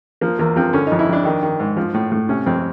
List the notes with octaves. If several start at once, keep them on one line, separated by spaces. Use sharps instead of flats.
F3 A#3
E2 A#3
F3 C4
D3 C#4
F2 D#4
E4
F2 D4
D#3
D#3
G#2
F3
A2
A2
C3 C#4
F2 C4